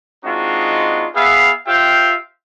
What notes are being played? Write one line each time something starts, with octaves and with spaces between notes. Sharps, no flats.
G#3 C4 D4 D#4 F4 F#4
B3 G#4 B4 E5 F5
F4 G4 C5 E5 F5 G5